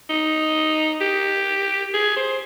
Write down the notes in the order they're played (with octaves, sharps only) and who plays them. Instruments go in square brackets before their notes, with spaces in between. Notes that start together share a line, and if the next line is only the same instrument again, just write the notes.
[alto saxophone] D#4
G4
G#4
C5